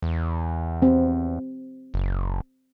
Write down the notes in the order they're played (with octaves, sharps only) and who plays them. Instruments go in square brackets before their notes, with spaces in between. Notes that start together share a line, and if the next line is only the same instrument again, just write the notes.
[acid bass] E2
[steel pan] C4
[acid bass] F#1